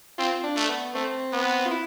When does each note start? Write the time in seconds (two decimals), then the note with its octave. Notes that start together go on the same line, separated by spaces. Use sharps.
0.18 C4 F4
0.44 D4
0.56 A3
0.69 B3
0.94 A3 C4
1.32 B3
1.65 F4
1.71 E4